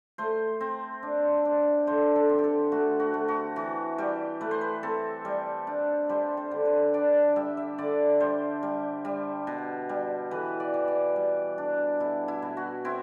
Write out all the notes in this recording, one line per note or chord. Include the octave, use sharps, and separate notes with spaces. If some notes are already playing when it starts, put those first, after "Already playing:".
A3 C5
C4
D4
D4
D3 C5
A4
C4
G4
A4
A3 F#4
F#4
A3
F#4
E3 F#4
G3 G4
A3 B4
C5
B4
C4 A4
G3
D4
G3 C5
C5
D3
B4
D4 D5
G3 E5
E5
D3 D5
G3 C5
G3
G3
B2
G3
E3 B4
D5
E3
D5
G3
D4
B2 E4
E4
B2
F#4
C4 E4